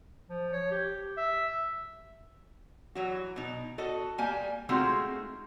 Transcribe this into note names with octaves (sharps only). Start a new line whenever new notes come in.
F3
C#5
G4
E5
E3 F#3 F#4
B2 D#4
F#4 A4 D#5
G3 A#3 G5 G#5
G#3 A3 C4 D#4 F4 F#4